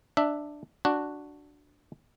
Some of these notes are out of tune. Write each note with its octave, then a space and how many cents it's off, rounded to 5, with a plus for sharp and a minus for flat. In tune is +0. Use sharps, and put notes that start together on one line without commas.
D4 +10 E5 +0
D4 +0 F#4 +0